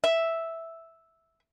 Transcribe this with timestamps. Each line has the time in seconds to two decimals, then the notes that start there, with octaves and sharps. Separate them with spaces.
0.04 E5